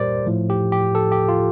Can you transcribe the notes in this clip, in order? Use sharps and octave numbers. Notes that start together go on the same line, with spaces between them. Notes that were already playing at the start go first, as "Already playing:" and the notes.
Already playing: A#2 G3 G4 A#4 C5 D5
A2 F3
G4
G4
A4
G4
F4